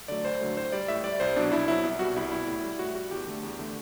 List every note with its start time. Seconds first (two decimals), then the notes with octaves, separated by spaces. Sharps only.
0.08 D3 F#3 A3 D5
0.25 D2 C5
0.41 D3 F#3 A3
0.56 A2 C5
0.72 G3 D5
0.88 A2 E5
1.04 G3 D5
1.20 C2 C5
1.36 B2 F#3 D4
1.52 C2 E4
1.68 B2 F#3 E4
1.84 C2
1.99 B2 G3 F#4
2.16 C2 E4
2.32 B2 G3 E4
2.47 A2
2.63 G3
2.79 A2 F#4
2.95 G3 F#4
3.11 E2 G4
3.27 D3 A3
3.43 E2
3.59 D3 A3